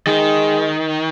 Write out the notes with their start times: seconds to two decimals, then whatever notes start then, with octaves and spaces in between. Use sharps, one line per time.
0.07 D#3 G#3